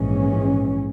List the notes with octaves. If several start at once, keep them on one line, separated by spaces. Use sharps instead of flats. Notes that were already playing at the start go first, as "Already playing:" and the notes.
Already playing: A#1 G#2 E3 G#3 C#4